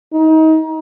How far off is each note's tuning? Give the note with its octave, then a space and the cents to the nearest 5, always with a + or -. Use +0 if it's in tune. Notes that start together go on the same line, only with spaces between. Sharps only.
D#4 +30